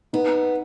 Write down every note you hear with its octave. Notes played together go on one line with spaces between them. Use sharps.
B3 D#4